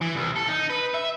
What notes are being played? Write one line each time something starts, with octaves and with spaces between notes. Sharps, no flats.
E3
C2
A4
D#4
B4
E5